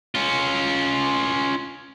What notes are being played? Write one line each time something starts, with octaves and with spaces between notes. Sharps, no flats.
C#4 F4